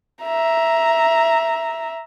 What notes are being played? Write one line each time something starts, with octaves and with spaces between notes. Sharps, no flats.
E5 A#5